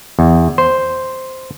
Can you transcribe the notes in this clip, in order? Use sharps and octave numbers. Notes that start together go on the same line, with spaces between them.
E2
C5